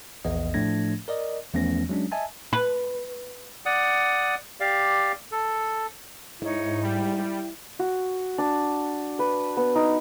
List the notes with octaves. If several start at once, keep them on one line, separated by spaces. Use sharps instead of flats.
A#1 E2 B3 D#5
A2 F3 A3 D4 G#6 A#6
A#4 D5 D#5
E2 F3 A3 B3 C#4 A#6
F#3 G#3 C#4 D4
D#5 E5 G#5 A5
B4
D5 F#5 D#6
G4 D5 F5
A4
G#2 D#4 E4 C#5
G3 G5
F#4
D4
B4
B3
D#4